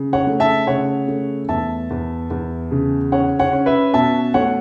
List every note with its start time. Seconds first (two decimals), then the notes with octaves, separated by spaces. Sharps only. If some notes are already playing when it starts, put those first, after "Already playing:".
Already playing: C#3
0.13 C#5 F#5
0.27 A3
0.40 E5 A5
0.67 C#3 C#5 F#5
1.08 A3
1.49 E2 E5 A5
1.90 E2
2.30 E2
2.71 C#3
3.12 C#4 C#5 F#5
3.39 C#5 F#5
3.53 C#4
3.66 B4 E5
3.93 B2 E5 A5
4.34 A3 C#5 F#5